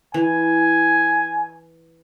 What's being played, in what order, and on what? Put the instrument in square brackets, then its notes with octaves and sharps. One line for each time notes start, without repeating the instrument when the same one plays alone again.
[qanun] E3 [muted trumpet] G#5